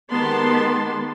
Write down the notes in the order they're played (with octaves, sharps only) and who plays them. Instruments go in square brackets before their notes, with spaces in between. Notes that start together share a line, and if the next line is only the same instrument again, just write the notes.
[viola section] D#3 G#3 B3 G4 A5 C6